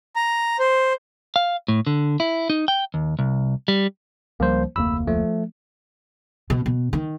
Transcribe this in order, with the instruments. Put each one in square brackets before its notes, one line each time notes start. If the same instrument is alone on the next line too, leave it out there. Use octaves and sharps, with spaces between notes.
[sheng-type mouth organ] A#5
C5
[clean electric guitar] F5
A2
D3
E4
D#4
G5
D#2
C2
G3
[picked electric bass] C#2 F3 G3 [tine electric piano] A#3 C5
[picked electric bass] F1 D2 A#3 [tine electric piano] B5 E6
[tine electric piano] F3 A3
[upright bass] B2
B2
D#3